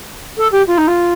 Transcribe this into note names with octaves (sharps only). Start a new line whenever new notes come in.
A4
G4
F4
D#4
F4